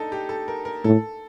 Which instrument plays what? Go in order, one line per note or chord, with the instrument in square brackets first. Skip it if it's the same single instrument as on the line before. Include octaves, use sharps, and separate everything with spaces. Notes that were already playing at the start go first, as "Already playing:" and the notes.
Already playing: [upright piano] D4 D#4 A4
G4
A4
A#4
A#4
[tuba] A2 [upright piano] A4